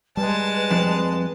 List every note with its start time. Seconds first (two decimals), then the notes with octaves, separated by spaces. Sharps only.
0.17 G3 G#3 B4 A5
0.71 F2